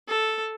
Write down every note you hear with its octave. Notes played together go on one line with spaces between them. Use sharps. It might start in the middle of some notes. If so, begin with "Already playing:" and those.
A4